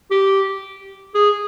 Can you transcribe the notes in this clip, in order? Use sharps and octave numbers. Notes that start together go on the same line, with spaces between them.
G4
G#4